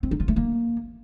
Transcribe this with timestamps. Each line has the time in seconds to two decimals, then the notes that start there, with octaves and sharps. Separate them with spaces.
0.03 C4
0.11 D#4
0.20 F4
0.28 A3
0.36 A#3